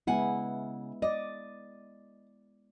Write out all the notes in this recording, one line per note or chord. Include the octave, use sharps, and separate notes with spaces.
C#3 G#3 B3 E4 F#5 G#5
D5 D#5